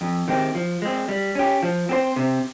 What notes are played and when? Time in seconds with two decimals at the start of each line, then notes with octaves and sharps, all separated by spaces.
0.01 F2
0.28 D#3 G#3 C4 G4
0.55 F3
0.82 G#3 C4
1.09 G3
1.35 C#4 G4
1.62 F3
1.89 C4 G4 C5
2.16 C3